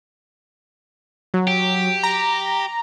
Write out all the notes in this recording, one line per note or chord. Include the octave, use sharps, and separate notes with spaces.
F#3
G4
A#5